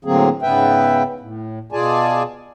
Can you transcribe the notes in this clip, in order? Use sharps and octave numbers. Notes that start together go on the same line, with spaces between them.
A2 D3 F#3 A#3 C4 G#4
G#2 C#3 B3 B4 E5 G5
A2
B2 F4 G#4 D5 G#5 A5